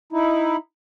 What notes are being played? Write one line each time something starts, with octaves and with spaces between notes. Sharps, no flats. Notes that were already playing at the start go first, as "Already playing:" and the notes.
D#4 E4